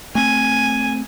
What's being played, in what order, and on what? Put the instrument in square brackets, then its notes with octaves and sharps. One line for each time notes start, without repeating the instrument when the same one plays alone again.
[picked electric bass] A3 C4 [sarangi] G#5